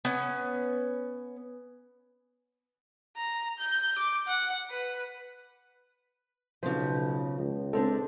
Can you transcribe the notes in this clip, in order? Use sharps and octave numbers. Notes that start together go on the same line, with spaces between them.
B3 C#4
A#5
G6
D6
F#5
B4
B1 C#3 F3
C#2
G#3 C4 D4 A4